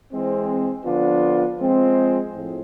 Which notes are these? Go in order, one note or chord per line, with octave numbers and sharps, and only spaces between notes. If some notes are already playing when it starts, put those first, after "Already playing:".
E3 G#3 C4
D3 F3 B3 D4 F4
F3 G#3 C4
A2 F3